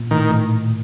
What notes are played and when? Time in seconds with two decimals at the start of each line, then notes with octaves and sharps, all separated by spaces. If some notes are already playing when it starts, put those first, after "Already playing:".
Already playing: A#2
0.11 A2 D#3